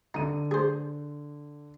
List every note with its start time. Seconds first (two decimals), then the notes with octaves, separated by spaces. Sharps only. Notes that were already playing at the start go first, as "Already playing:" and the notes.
0.14 D3 D#4 D#7
0.51 G#4 C5